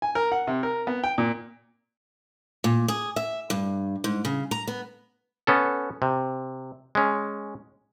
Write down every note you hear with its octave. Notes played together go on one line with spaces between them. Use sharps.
G#5
A#4
F#5
C3
A#4
B3
G5
A#2
A#2
G#4
E5
G2
G#2
C#3
A#5
B3
B3 C#4 A4
C3
G#3 C#4